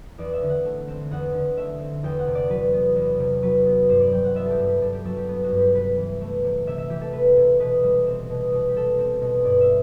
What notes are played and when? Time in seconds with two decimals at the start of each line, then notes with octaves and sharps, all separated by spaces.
0.18 E2 D5
0.33 E5
0.42 D3
0.49 F#5
0.65 A3
0.88 C4
1.11 E2 F#5
1.34 D3
1.57 A3 E5
1.80 C4
2.03 E2 G5
2.19 F#5
2.27 C3
2.35 D5
2.50 F#3 B4
2.73 B3
2.96 E2
3.19 C3
3.42 F#3 B4
3.66 B3
3.89 G2 C5
4.00 D5
4.12 F#3 G5
4.24 F#5
4.35 B3 E5
4.46 G4 A4
4.59 G2
4.67 G4
4.82 G2 A4
4.93 G4
5.05 F#3 A4
5.17 G4
5.28 B3
5.44 F#4
5.51 G2
5.58 G4
5.74 C3 B4
5.97 E3
6.21 A3
6.44 C3
6.67 C3 E5
6.78 E5
6.89 E3 G4
7.01 A4
7.13 A3 B4
7.37 C3
7.60 B2 B4
7.84 G3
8.06 C4
8.29 B2
8.52 B2
8.68 G4
8.76 G3 A4
8.99 C4
9.21 B2
9.45 G2 D5
9.61 E5